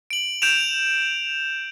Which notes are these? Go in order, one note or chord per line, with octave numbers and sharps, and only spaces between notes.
D7 F#7
G6 D7 E7 F7